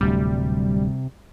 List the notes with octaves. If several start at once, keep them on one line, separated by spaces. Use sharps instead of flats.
D1 D2 C3 G3